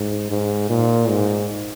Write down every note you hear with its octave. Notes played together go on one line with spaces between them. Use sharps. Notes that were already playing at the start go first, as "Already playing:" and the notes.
Already playing: G#2
G#2
A#2
G#2